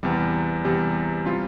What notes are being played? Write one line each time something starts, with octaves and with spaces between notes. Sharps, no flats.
E2 C3 G3
E2 C3 G3
C3 G3 C4 F4